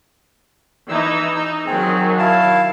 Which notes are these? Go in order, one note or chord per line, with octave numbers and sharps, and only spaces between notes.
E3 D#4 E6
D#4
D#3 F#3 C4 G#4
E4 F5 A5